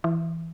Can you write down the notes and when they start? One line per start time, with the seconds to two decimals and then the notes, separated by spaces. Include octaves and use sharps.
0.04 E3